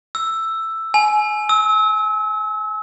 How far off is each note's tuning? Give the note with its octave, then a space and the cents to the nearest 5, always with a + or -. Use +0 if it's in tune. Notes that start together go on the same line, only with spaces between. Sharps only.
E6 +5
G#5 +25
E6 -35